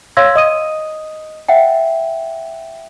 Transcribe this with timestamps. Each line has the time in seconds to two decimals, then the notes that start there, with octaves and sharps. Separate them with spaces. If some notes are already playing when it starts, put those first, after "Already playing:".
0.17 C#5 F5 C6 E6 G#6 A#6
0.36 D#5 D#6 D#7
1.49 E5 F#5 G5